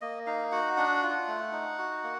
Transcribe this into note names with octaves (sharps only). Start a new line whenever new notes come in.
A#3 D#5
D#4 F5
F#4 F#5
D4 F#5
F4
A3
D#4
F#4
A#3